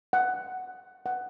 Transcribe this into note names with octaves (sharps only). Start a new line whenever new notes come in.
F#5
F#5